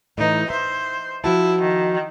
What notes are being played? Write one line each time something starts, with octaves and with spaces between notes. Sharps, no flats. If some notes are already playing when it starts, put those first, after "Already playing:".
A2 E3 D#4
C5 E5
F3 E4 F#4 A5
D#3